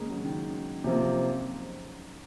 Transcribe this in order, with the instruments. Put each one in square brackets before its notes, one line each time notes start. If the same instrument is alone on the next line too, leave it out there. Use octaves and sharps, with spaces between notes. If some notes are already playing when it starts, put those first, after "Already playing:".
Already playing: [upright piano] C#3 G#3 A#3
F#3
C#3
D#3
[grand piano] C3 F3 A#3